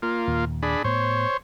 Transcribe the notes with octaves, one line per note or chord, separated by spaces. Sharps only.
A#3 F4
D#2 A#2
D4 G#4 B5
A2 B3 C5 C#5